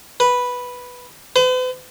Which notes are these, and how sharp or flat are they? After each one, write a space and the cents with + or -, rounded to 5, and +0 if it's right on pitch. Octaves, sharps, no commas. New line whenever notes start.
B4 -5
B4 +45